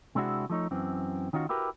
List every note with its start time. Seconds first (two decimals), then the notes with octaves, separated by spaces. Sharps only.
0.15 C3 G#3 C4 D4 E4 F#4
0.50 F3 A3 D#4 C#5
0.71 F#2 E3 C4
1.33 D#3 C#4 D#4 F4 F#4
1.49 E4 F#4 G4 A#4 B4